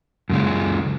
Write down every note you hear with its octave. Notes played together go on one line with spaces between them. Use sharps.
F#2 C#3 G#3